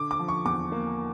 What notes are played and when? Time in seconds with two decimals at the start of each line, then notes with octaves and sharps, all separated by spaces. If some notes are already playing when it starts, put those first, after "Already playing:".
Already playing: D3 D6
0.11 D6
0.19 F3
0.28 C#6
0.45 E2 D6
0.72 A#3